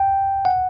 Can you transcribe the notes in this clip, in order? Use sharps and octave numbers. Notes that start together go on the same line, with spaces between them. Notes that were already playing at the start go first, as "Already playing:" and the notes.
Already playing: G5
F#5